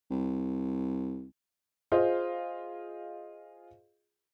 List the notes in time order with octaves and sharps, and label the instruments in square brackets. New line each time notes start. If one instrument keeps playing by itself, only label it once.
[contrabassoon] C2
[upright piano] F4 G#4 C5 D#5 F5